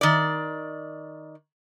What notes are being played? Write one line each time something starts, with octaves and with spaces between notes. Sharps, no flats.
D#3 D5